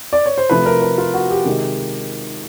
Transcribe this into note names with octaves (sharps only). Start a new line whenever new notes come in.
D5
C#5
C5
C3 F3 A3 B4
A#4
B4
F4
F#4
G4
C3 D#3 G#3